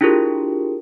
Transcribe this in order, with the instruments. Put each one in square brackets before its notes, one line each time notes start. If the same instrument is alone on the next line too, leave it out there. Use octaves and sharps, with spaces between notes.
[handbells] D4 E4 F4 G4 G#4 A#4